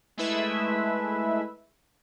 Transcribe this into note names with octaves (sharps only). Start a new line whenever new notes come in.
G#3 A3 E4 B4 E5